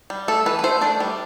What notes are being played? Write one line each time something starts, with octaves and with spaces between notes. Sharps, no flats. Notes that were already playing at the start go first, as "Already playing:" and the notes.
G3
A3 A4
E3 B4
B4
A3 C5
D4 D5
G3